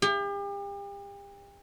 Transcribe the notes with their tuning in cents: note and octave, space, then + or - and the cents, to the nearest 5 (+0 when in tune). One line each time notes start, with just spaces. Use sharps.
G4 +40